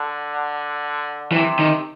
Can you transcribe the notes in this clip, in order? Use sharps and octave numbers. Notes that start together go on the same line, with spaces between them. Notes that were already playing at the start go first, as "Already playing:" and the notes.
Already playing: D3
C3 E3
D#3